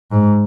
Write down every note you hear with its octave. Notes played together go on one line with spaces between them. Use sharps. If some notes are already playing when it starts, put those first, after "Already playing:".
G#2